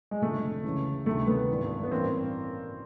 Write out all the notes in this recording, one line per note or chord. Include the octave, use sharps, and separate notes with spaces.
G#3
F1 F2 D3 A3
C#2 C#3 E3
D2 C3 D#3 A3
A3 B3
G#1 G2 E3
B3
A1 G2 E3 A#3 C4